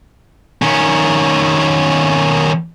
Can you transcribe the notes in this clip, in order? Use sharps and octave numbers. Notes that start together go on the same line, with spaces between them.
D#3 C#4